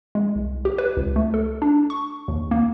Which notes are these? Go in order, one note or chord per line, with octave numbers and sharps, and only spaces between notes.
G#3
C2
G4
B4
C#2
A3
A4
D4
C#6
D#2
A#3